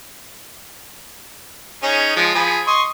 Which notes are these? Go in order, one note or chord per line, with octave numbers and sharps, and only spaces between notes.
C#4 D#4 G#4
F3 G#3
F3 G#4 B5
D#5 C6 C#6